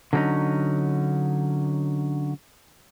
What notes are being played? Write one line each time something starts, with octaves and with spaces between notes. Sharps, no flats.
D3 F#3 G#3 C4 C#4 D#4